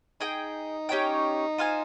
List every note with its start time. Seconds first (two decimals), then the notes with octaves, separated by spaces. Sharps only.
0.20 D#4 G#4 D#5 G5
0.89 C#4 G4 C#5 G5
1.58 F4 C5 F5 G#5